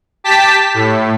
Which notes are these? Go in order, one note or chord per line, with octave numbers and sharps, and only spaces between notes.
G4 A5 B6
A2